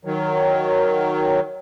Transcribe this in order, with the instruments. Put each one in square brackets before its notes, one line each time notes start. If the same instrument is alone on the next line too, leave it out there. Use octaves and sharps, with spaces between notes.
[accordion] D#3 F#3